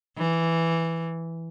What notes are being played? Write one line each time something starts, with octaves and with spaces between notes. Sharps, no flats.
E3